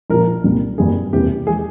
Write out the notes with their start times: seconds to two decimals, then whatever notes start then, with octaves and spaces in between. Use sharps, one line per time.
0.10 A#1 A#2 F3 A#4
0.44 C2 A#2 G3 A#3
0.78 G#1 G2 G3 A#3 G#4
1.13 E1 E2 C3 E3 A#3 G4
1.47 E3 G#3 G#4